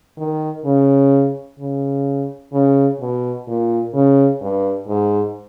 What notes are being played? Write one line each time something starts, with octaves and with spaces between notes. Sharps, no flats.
D#3
C#3
C#3
C#3
B2
A#2
C#3
G2
G#2